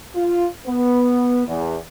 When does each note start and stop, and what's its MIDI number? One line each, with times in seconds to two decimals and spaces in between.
0.15 0.47 65
0.67 1.44 59
1.47 1.77 40